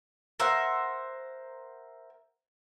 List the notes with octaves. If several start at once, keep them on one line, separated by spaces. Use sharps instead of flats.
A#4 C5 E5 F#5